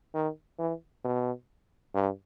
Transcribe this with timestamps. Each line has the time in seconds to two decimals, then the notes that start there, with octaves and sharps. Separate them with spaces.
0.14 D#3
0.59 E3
1.04 B2
1.95 G2